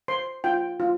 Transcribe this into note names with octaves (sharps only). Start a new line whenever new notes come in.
C5 C6
F4 G5
F4